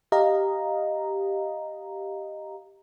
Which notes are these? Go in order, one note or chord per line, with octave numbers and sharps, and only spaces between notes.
G4 D#5 F5 A#5